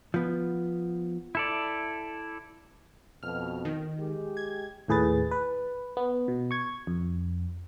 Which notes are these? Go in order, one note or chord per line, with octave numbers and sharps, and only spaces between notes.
F3 B3
E4 A4 D5
F2 B2 F6
D#3
G#3 G4
G#6
D#2 A2 G#4 B4 A6
B4
B3
B2
C#6 G#6
F2